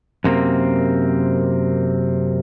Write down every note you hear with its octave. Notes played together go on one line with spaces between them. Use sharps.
F#2 C3 A#3 C4